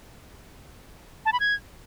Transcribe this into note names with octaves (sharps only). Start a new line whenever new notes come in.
A5
B5
G#6